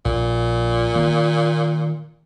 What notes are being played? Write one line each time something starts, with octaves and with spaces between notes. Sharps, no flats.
A#1 A#2
D#3 A#3